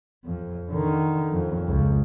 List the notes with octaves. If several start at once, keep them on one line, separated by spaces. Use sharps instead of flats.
F2
D3 D#3
F2
C#2